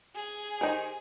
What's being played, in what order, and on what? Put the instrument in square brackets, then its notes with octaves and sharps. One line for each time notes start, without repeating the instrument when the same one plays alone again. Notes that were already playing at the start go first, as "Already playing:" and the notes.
[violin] G#4
[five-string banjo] D#3 D#4 [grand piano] G4 C5 D#5